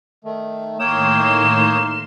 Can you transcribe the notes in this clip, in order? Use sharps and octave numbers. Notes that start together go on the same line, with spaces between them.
D#3 A3
A2 D#3 A#3 C#5 G5 C6 D#6 E7